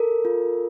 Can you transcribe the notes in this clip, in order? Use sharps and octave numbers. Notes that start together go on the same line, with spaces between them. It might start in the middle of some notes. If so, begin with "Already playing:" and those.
Already playing: A4 A#4
F4